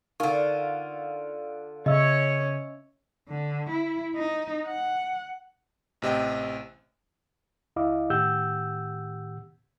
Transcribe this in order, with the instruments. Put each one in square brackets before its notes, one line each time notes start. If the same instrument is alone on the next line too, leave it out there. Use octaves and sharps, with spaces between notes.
[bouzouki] D3 F4 [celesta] D#4 A#4 C#6
[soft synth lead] C#3 [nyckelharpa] C#4 C#5 [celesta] D#5 E5 E6
[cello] D3
E4
D#4
F#5
[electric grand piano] A1 C3 D#5 G5
[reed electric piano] C#2 E4 D#5 F5 D6
A2 D#3 G4 F#5 E6 G6